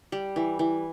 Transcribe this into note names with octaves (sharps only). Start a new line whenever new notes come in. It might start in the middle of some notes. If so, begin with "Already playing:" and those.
G3
E3
E3